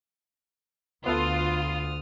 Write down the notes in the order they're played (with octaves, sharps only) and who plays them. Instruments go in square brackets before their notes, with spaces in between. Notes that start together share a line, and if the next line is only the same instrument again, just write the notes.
[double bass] D2 [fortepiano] B3 A4 [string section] F4 [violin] D#6 F6